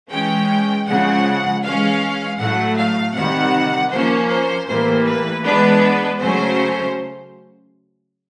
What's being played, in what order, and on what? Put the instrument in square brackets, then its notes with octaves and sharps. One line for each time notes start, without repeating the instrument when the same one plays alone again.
[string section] E3 G#3 C#4 G5
C#3 F3 G#3 F#5
E3 G#3 C#4 F5
A2 F#3 A3 F#5
F5
C3 D#3 G3 F#5
F3 A#3 C#4 C5
C5
A2 E3 G3 A#3 C5
B4
E3 G#3 B3 D4 B4
C#3 F#3 A3 C#4 C5